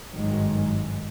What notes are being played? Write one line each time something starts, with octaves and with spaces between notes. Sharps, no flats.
G#1 G2 D#3 F#3 G#3